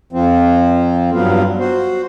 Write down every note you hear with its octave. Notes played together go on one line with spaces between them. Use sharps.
F2 F3 C4
G2 F#3 B3 F4
F#4 C5